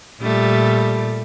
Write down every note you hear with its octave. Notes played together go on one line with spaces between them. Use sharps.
A#2 G3 A3